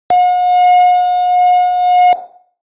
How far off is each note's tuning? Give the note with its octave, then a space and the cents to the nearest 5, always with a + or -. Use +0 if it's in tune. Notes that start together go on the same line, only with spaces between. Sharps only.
F#5 -45